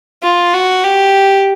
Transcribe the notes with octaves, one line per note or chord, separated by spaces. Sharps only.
F4
F#4
G4